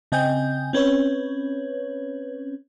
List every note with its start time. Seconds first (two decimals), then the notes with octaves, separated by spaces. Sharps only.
0.12 C#3 C4 D#5 G5 G#5 G6
0.73 C4 C#4 B4 C#5